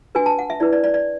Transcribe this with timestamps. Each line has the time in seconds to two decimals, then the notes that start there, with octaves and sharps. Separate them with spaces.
0.15 D4 F#4 B4 G#5
0.26 A5
0.39 F#5
0.50 E5
0.60 E4 B4 D5
0.73 D5
0.84 D5
0.94 D5